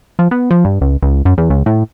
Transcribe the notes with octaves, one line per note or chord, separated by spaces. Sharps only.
F3
B3
F3
G2
C#2
C#2
F#2
E2
C#2
A2